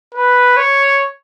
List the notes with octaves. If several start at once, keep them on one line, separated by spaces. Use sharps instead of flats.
B4
C#5